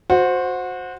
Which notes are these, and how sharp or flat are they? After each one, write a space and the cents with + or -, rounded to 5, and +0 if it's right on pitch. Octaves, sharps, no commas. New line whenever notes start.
F#4 -25 C5 +0